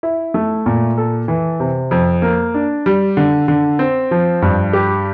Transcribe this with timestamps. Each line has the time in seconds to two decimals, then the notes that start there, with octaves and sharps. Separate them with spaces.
0.03 E4
0.34 A3
0.66 A#2
0.98 A4
1.28 E3
1.60 C3
1.91 F2
2.22 A#3
2.54 D4
2.86 G3
3.17 D3
3.48 D3
3.79 C4
4.11 F3
4.42 G2
4.73 G4